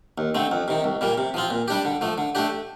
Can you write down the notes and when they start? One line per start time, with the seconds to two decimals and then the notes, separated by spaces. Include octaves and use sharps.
0.18 D#2
0.35 D3 A3 C4
0.51 F2
0.68 C3 D#3
0.84 C2
1.01 A#2 G3 A#3
1.18 C3
1.34 F3 C4 F4
1.50 A#2
1.68 G3 D4 G4
1.85 D3
2.01 F3 A3
2.18 D3
2.35 A3 D4 G4